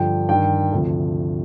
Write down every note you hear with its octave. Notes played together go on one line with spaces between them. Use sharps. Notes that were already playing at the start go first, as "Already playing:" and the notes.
Already playing: G2 D3 F3 G5
G2 D#3 G5
D2 C3 F3